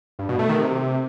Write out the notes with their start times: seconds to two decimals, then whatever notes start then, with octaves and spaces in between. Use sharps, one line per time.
0.19 G2
0.29 B2
0.39 A3
0.49 D#3
0.59 C3